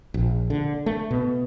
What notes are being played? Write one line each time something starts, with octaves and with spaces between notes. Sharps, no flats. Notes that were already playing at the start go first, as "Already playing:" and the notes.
A#1
D3
A3
B2